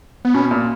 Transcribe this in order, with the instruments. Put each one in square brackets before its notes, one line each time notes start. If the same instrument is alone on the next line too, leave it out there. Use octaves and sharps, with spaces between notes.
[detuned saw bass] B3
[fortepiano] B2 [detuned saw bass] C#4
[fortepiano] A#2